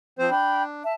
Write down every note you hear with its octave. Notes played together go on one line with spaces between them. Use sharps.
F3 C4 C5
D4 G5 B5
E5 A5